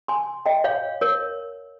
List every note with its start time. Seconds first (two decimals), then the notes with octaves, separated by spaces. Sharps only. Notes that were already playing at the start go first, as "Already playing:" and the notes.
0.08 G#5 C6
0.46 D#5 G5
0.64 C#5 F5
1.01 A#4 C#5